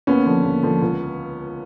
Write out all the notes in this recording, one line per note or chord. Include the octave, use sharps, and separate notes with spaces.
D#2 B3 C#4
D3 F3
D#2
D3 F3
C#2